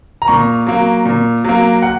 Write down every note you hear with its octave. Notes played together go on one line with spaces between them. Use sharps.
A#5
A#2 C#6
F#3 A#3
A#2
F#3 A#3
F#5